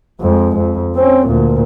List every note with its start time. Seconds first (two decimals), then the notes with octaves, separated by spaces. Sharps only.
0.21 F2 G#3
0.57 F2
0.96 C4 C#4
1.27 D2 A#2